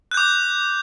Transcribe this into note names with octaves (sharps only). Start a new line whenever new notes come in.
D6 F#6 G6